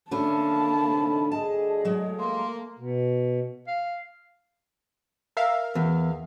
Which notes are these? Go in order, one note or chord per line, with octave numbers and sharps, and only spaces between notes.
D3 A3 A#3 C#4 A5 B5
A2 C3 D#4
D2 G3 G#4 D#5 A5
F#3 G#3 A3
A#3 C6
B2
F5
A#4 E5 F5
E2